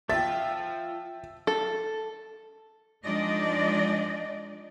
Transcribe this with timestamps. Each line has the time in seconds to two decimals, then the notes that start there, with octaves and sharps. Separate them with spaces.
0.09 F3 F4 E5 G5 A5 A6
1.47 A4
3.04 F3 G#3 D4 D#4 D5 D#5